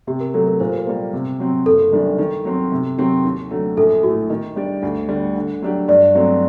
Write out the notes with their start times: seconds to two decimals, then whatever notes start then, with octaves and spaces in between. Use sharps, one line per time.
0.07 C3 G4
0.20 A#4
0.34 F#3 A3 A4
0.47 A#4
0.60 A#2 C5
0.69 A#4
0.77 C5
0.87 G3 A#3
1.13 C3
1.40 F#3 C4
1.66 F#1 A4
1.92 F#2 D#3 G3 D4
2.19 D#3
2.45 F#3 C4
2.72 C3
2.98 D#3 F#3 C4 G4
3.24 D#2
3.51 D3 F#3 A3
3.77 A#1 A4
4.03 A2 A3 F#4
4.30 D#3 D#5
4.56 G3 D4 G4 D5
4.83 D2
5.09 D3 G3
5.36 D3
5.62 F#3 A3 D4 G4
5.88 G2 D5
6.15 F#3 A3 C4 D#4